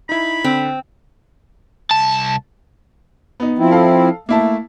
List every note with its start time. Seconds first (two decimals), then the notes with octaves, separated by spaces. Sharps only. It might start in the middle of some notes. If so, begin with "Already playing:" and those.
0.09 D#4 E4 B5
0.44 D3 C4
1.91 C2 A5
3.40 B3 D#4
3.59 F3 C4 E4
3.71 A4 F5
4.29 A3 A#3 E4 A5